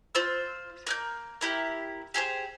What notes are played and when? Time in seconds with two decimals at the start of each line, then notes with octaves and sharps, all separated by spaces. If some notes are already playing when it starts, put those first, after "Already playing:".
0.15 F4 C5 E6
0.87 A#3 F#6 G6
1.41 A#3 E4 G4
2.14 G4 G#4 A#4 C5